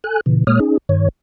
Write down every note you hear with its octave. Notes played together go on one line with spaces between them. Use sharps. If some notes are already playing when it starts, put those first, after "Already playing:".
A4 G#5 F#6
A#2 C#3 E3
A#2 G#3 A#3 C#5 D#6 F6
C#4 D#4 G#4
G2 D#3 C#5